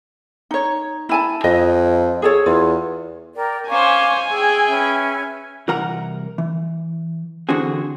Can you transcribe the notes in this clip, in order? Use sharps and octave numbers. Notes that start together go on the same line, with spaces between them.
D#4 C#5
E4 G#5 A5
F2 D#5
G#4 A4 C#5
E2 F4
A#4 D5 G5
C#4 C5 F5 G#5 C#6 D6
G#4 G5 E6
C#4 B4 E5
C2 E3 A#4 F#5 A#5
E3
D3 E3 C4 D4 F#4 G#4